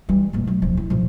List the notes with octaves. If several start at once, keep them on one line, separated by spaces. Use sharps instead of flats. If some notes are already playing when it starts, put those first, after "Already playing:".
E3 G3
F1 A#2
F#3 A3
D#1 F3
E4
A#2 F3